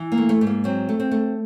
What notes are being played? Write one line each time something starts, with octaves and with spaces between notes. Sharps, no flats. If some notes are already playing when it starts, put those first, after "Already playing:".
Already playing: E3
A#3
A3
A3
G#2
A#3
F#3 C4
A3
C4
A3